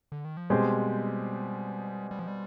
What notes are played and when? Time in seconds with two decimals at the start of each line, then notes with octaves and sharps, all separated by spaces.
0.12 D3
0.25 D#3
0.37 F3
0.50 B2 G3 G#3 C4 G4 C5
2.11 G3
2.19 F3
2.28 G3